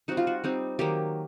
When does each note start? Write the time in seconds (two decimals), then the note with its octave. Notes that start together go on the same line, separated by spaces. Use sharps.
0.08 G3 C4 D#4 F#4
0.17 F4
0.27 F#4
0.44 G3 C4 D#4
0.79 D#3 F#3 A#3 G4